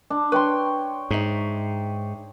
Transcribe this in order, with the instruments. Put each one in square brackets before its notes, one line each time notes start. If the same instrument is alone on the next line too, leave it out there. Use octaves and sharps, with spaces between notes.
[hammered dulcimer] D4
[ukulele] B4 [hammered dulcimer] C#5 G5 C6
[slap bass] G#2 [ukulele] D#4 E5